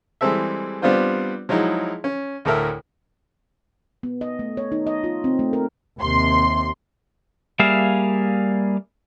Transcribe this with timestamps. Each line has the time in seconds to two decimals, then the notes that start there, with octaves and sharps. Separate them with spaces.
0.21 E3 G3 G#3 C4 A4 E5
0.82 G3 B3 C4 D4 F4 C5
1.49 F3 F#3 G#3 D#4 E4
2.04 C#4
2.45 D2 A2 A4 A#4 E5
4.03 B3
4.21 D#5
4.39 A3
4.57 C#5
4.72 D#4
4.87 D#5
5.04 F4
5.24 C4
5.39 A3
5.53 A#4
6.00 D#2 C3 C6
7.60 G3 A#3 G#4 E5 F5